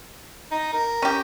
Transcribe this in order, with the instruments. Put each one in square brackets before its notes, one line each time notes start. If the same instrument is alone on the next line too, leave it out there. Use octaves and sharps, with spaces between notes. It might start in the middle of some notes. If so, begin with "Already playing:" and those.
[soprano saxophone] D#4
A#4
[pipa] C#4 G4